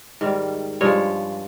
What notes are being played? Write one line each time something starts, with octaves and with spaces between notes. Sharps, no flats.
G#2 D#3 G3
G2 F3 G#3 C#5